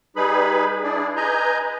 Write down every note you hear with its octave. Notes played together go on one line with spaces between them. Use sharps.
G3 D#4 G#4 B4 B5
D4 E4 G#4 D5
B4 D#5 G#5 A#5 G6